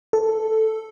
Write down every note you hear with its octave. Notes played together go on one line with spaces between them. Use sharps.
A4